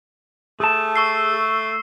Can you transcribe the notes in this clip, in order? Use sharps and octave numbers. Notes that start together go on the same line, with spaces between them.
A3 G#4 A5
C#6 E6 C7